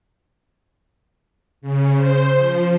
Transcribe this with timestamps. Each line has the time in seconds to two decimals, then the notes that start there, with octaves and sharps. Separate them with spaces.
1.61 C#3
1.96 C5
2.38 F3